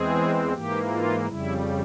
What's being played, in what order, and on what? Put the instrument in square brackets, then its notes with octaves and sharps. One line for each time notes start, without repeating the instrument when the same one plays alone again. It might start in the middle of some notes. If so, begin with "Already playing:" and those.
Already playing: [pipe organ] E2 E3 G#3 C4 G#4
G#2 E3 A#3 G4
F4
F2 C#3 G3 E4